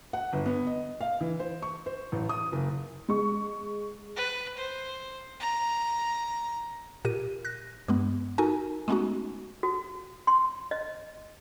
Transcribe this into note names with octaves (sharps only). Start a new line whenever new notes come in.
F#5
G1
B3
D#5
F5
E3
C5
C#6
C5
A1
D#6
F#1
G#3 C#6
B4
C5
A#5
A#2 G4 A#4 D#7
F#6 A#6
G2 G#3 B3
D#4 F#4 A4 A#4 G#5
G#3 A3 B3 C#4 D#4 F#4
F#4
C6
D#5